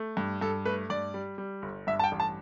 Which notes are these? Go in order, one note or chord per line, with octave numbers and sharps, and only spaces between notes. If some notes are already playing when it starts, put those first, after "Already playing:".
Already playing: A3
G2
G2 A4
A3 B4
G2 D5
G3
G3
G1
G2 E5
A5
G5
A1
A5